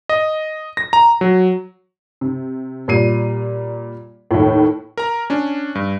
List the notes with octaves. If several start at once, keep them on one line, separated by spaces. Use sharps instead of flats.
D#5
A#6
A#5
F#3
C3
A#2 G3 C7 D#7
D#2 A2
A#4 A#5
C#4 D4
G2